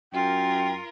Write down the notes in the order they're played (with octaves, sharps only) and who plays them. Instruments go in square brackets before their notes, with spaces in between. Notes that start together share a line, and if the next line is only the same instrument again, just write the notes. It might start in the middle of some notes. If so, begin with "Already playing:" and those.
[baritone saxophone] F#2 [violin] F4 A#4 [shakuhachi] G5